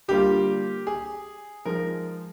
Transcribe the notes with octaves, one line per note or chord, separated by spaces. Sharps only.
D3 G3 A#3 F4 G4
G#4
F3 G#3 D#4 A#4